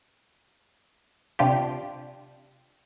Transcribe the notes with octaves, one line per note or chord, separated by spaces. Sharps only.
C3 D4 F4 G4